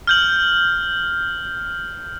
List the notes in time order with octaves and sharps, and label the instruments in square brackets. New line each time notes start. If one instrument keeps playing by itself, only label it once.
[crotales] F6 G6 F#7